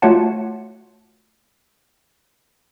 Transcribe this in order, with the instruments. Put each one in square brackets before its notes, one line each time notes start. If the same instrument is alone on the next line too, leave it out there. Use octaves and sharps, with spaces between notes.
[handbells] A3 F4 F#4 C#5 F#5 A5